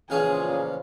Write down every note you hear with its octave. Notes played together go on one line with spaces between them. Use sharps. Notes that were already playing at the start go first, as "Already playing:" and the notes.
A1 A#2 C#3 F3 C#4 G#4 F5